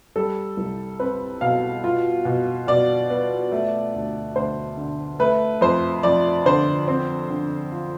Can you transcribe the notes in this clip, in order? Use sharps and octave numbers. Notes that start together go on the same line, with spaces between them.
G3 A4
C2
C4 B4
B2 F5
F4
B2
B2 D5
B3
A3
D2
D2 C5
D3
A3 B4
F2 C5
F2 D5
D3 C5
C4
D3
F4